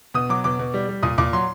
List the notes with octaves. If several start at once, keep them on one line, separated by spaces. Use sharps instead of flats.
B2 D#6
F#3 D6
B2 D6
B2
G3
G3
A#2 D#6
A#2 D6
F#3 C6